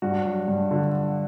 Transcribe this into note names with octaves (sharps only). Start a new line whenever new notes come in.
G2 F#4
F#3
G2
D3